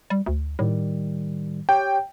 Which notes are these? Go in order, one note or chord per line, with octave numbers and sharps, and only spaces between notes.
G3
D2
A2 D#3 G3
G4 C#5 G5